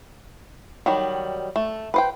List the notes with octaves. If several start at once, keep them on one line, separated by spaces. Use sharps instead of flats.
D#3 F#3 G3
A3
B4 C5 G5